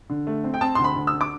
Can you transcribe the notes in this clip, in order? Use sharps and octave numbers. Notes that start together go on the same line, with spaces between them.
D3
A3
C4
G5
C4 A5
D2 C6
B5
D2
E6
D3
D6